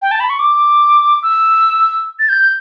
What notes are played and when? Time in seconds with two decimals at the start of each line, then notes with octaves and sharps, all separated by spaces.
0.02 G5
0.11 A5
0.20 B5
0.30 C#6
0.39 D6
1.23 E6
2.19 A6
2.29 G6